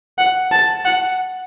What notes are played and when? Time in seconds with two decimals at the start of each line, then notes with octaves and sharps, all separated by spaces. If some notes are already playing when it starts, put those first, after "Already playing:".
0.18 F#5
0.52 A5
0.85 F#5